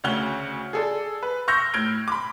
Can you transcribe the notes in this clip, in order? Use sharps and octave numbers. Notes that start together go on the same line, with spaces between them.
D2 C#3 C#5 F#5 F6 G7
G#4 A4 D5
B4
C#6 E6 F6 G6 A#6
A2 F6 G#6 D7 G7
B5 D6